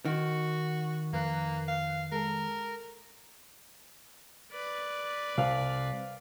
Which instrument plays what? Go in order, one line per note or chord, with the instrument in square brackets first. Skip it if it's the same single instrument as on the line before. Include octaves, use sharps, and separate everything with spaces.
[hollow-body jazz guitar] D#3 [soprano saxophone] F#4
[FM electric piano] F2 B4 F#6 [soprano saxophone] A#3
[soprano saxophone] F5
[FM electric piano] G#3 A4 [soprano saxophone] A#4
[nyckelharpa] B4 D5
[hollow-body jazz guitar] C2 [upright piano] F5